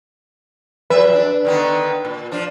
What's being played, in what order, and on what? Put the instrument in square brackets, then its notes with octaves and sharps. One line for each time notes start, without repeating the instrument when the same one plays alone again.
[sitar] F2 F#3 E5 [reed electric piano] B4
[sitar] D4
D3 D#3 B3
A#2
F3 D4